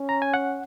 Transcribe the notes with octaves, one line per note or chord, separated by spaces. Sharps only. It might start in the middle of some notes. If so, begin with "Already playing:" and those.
Already playing: C#4
A#5
G#5
F#5